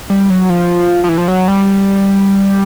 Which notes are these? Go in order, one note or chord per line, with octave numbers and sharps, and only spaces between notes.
G3
F#3
F3
F3
E3
F3
F#3
G3